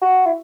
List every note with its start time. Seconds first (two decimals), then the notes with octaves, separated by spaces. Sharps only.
0.02 F#4
0.26 E4